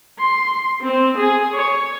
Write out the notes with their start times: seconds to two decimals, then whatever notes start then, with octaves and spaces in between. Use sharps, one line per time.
0.20 C6
0.82 C4
1.20 G#4
1.55 C#5